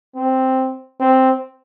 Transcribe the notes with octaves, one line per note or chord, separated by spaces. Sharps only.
C4
C4